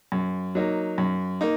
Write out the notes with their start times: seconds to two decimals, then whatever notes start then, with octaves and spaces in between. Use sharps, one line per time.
0.12 F#2
0.55 F#3 A#3 D#4
0.98 F#2
1.41 A#3 D#4